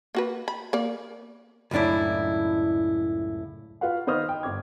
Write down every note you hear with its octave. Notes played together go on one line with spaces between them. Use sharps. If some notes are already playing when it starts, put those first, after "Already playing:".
A#3 F#4 B4
B5
A#3 D5
C#2 F#2 A2 D4 E4
F4 F#4 B4 F5 F#5
D#3 B3 C5 D#5 D#6 F6
G5
G1 D6 G#6